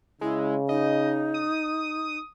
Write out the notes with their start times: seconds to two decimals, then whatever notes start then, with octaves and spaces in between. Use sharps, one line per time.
0.21 C#3 G#3 E4
0.69 D#4 D#5
1.34 D#6